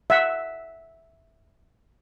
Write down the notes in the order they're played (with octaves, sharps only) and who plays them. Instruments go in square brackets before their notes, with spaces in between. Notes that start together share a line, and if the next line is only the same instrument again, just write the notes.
[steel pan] E5 F#5